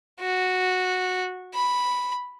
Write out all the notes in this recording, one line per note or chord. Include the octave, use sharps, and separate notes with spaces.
F#4
B5